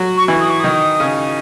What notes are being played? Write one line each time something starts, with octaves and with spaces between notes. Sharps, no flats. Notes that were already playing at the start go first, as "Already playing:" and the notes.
Already playing: F#3 F#4
C#6
E3 E4
D#6
C#6
D#3 D#4 D#6
C#3 C#4